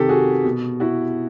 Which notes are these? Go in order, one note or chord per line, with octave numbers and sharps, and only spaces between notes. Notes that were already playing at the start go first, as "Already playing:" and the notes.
Already playing: C3 D#3 G4 A4
F#4 G#4
B2
E4 F#4